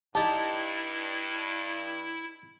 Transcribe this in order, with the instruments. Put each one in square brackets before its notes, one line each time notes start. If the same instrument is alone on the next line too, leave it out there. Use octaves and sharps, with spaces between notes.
[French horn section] G2 [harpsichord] D#4 G4 [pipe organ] E4 [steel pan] A5